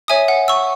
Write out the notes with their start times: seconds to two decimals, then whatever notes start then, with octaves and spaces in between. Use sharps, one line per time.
0.08 C#5 E5 G#5 D#6
0.28 F#5
0.48 C#6 E6